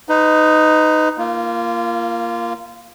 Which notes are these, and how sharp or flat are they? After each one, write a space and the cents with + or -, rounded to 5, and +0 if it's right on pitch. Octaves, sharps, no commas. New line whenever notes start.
D#4 +0 B4 +30
A#3 +0 F4 -25